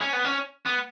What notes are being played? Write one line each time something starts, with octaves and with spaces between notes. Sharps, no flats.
C#4
B3
C#4
B3